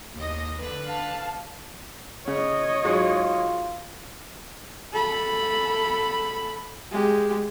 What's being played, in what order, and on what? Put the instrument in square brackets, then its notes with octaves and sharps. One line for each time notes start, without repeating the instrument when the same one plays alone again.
[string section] D#2 D#5
D3 B4
[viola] F5 A5
[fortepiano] C#3 [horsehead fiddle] C#5 D#5
[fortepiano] G#2 F#3 G#3 [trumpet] F4
[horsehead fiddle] A4 B5
G#3 G4